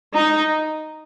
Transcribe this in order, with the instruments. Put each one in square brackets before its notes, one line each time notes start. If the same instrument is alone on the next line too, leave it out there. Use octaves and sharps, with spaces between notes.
[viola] D#4